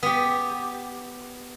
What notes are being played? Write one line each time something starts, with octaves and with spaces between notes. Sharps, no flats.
B3 G4